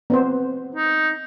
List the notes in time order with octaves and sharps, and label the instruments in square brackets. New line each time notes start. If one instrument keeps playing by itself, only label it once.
[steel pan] B3 C4 C5
[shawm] D#4